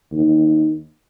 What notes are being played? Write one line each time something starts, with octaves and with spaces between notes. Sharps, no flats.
D#2